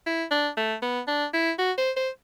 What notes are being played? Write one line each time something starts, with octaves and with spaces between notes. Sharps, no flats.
E4
D4
A3
B3
D4
E4
F#4
C5
C5